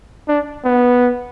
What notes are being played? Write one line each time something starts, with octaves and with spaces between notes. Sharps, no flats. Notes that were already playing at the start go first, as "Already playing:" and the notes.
D4
B3